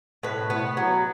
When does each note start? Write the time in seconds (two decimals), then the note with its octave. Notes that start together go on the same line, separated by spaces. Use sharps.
0.23 A2 B4
0.50 B3
0.77 F#3